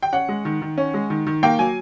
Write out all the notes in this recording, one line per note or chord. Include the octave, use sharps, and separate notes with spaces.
G5
C#4 F#5
G#3
D#3
D#3
C#4
G#3
D#3
D#3
A#3 G5
F#3 G#5